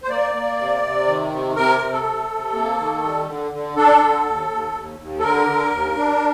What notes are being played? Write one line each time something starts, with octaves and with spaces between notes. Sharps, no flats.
C5
A#3 D5
A#3
C3
C3
D#3
C3
C3 A#4
C3
A4
C3
C3
A#3
D#3
G3
D3
D3
D4 A4
D3
D#2
D#2
D#2
D#2
A4
D3 A#4
D3
D#2
D4